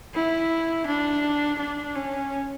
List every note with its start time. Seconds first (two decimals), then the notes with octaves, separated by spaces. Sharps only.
0.15 E4
0.87 D4
1.59 D4
1.96 C#4